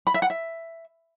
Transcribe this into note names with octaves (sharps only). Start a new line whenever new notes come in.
B5
E5
F#5
E5